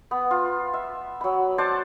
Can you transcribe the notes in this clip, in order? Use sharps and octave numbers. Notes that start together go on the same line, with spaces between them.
B3
F4
E5
F#3 B5
C5 D5 F#5 A5